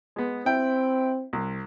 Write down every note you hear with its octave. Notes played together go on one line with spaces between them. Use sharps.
G#3 B3
C4 E4 G5
C2